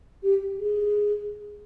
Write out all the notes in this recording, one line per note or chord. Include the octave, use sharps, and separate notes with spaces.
G4
G#4